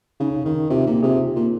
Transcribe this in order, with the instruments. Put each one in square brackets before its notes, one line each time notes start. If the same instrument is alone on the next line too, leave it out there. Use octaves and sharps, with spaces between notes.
[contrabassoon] C#3 [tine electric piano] D#4
[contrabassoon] D#3
[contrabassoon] C3 [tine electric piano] F4
[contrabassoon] A#2
[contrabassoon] C3 [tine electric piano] G#4
[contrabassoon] A#2